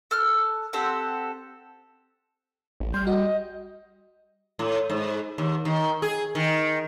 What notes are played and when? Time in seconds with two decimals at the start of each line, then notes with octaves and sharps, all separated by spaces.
0.11 A4 F6 F#6
0.73 C4 G4 A4 F#5
2.80 A1
2.94 G3 C6 F6 G6
3.07 F#4 D#5
4.59 A2
4.90 G#2
5.38 D#2
5.65 D#3
6.02 G#4
6.35 D#3